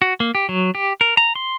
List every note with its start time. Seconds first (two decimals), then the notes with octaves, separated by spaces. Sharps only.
0.02 F#4
0.20 A#3
0.35 G4
0.49 F#3
0.75 G4
1.01 A#4
1.17 A#5
1.36 C6